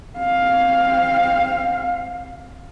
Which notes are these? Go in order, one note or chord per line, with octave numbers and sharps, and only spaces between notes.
C4 F5